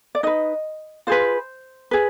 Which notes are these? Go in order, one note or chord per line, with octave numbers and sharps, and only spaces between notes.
D5
D#4 B4 D#5
F4 G#4 B4 C5
G#4 B4